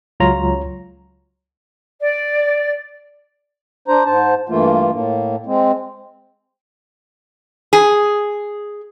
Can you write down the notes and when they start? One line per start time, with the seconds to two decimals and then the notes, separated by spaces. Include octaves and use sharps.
0.20 C#2 F#3 F4 C#5 A#5
2.01 D5
3.88 D4 C5 A#5
4.05 G#2 C5 A5
4.49 G2 E3 A3 A#3 F4
4.92 A2 A#3
5.46 G#3 C4
7.73 G#4